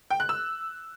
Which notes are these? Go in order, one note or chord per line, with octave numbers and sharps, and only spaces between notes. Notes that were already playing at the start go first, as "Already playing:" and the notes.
G5
F#6
E6